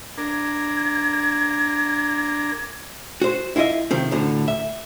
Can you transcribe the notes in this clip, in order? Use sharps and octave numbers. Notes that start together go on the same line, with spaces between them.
D4 A#4 G#6
F#4 C5
E4 F4 A4 D#5 E5
C3 D#3 F3 C4
D2 A2 D3
E5